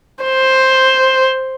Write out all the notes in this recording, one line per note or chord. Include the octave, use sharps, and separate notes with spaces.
C5